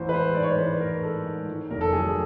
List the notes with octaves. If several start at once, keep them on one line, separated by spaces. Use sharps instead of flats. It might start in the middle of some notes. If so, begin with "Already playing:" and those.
Already playing: A1 E3 C5
B4
G#3 C5
G#2 D5
C#5
C5
E3 B4
A1 A#4
G#3 A4
G#2
D#3
F1 A#4
A4
F#3 G#4